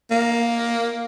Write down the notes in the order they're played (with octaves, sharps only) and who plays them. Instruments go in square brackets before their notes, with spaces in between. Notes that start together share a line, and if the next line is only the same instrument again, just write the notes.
[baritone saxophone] A#3